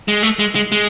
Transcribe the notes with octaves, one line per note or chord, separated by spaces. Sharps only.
G#3
A3
G#3
G#3
G#3